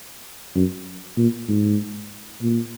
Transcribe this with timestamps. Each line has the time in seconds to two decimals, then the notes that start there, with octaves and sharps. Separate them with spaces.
0.55 F#2
1.17 A#2
1.49 G#2
2.42 A#2